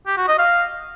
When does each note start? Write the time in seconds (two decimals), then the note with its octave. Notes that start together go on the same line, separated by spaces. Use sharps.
0.07 G4
0.17 F#4
0.28 D#5
0.39 F5